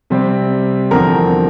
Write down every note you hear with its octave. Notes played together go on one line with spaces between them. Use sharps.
C3 G3 C4
E2 D3 F3 C4 A#4